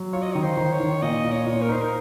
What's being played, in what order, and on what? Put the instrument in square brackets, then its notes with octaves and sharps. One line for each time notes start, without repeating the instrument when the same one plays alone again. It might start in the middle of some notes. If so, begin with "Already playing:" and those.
Already playing: [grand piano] F#3
[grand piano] F4 [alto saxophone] C#5
[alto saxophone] D#5
[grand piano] D#3 [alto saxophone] C#5
[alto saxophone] C5
[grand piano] D#3
[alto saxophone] C#5
[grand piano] D#3
[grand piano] A#2 [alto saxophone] D#5
[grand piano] A#2
[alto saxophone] C#5
[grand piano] A#2
[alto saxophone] A#4
[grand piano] D#4 [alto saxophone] C5
[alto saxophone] A#4